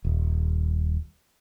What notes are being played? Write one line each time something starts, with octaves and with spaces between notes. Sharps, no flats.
D#1